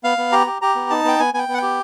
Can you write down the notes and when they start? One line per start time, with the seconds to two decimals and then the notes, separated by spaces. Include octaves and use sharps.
0.04 B3 F5
0.18 B3
0.32 G4 A#5
0.47 G4
0.62 G4 A#5
0.75 B3
0.90 D#4 A5
1.04 B3 G5
1.19 B3 G#5
1.34 B3 G#5
1.38 G5
1.49 B3
1.54 F#5
1.58 G4 G5